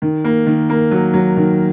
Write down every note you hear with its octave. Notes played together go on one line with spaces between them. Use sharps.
D#3
A#3
D#3
A#3
F#3
F#3
D#3